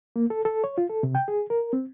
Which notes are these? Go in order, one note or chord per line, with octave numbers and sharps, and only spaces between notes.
A#3
A4
A4
C#5
F4
A4
C3
G5
G#4
A#4
C4